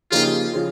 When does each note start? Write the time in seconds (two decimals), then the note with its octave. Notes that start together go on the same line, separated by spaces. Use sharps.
0.11 C#3 F3 A#3 D#4 F4 G4
0.53 C#3 F3